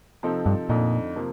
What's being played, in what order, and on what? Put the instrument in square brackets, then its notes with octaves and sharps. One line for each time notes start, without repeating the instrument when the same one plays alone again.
[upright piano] C3 F3 C4 D#4 A4
[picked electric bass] G2
[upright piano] F2 D3 A3 D#4 [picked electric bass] A#2
[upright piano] C3 F3 A#3